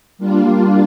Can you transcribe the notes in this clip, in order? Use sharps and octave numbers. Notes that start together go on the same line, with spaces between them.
G3 A#3 D4 F4